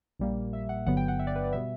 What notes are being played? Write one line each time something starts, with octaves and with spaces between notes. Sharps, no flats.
A#1 A#2 G3 A#3
E5
F#5
G1 G2 D3 F#3 B3 F#5
G5
F#5
E5
D5
B4
D5
B2 G3 B3 E5